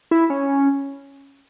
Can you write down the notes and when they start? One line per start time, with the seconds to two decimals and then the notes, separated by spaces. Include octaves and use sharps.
0.11 E4
0.30 C#4